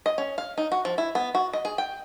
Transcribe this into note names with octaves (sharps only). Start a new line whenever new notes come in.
D#5
C#4
F5
D#4
F#4
F3
E4
B3
F#4
D#5
G#4
G5